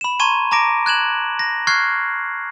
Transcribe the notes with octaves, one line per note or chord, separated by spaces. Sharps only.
B5 E7
A5 A#5 C6 C#6 G#6 D#7
A5 A#5 D6 A#6 D7
F#6 G#6 E7 F#7
A#6
C#6 F6 F#6 G#6 C7